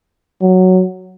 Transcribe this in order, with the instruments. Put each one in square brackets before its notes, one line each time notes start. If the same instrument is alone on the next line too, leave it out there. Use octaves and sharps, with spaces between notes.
[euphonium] F#3